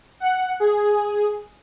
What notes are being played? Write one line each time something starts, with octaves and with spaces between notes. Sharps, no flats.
F#5
G#4